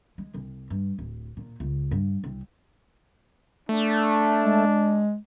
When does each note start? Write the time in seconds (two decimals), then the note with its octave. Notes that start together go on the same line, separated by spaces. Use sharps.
0.18 G#3
0.34 C2
0.70 G2
0.99 D1
1.37 A#2
1.60 C#2
1.91 G2
2.24 C2
3.69 A3 D4
4.45 G#3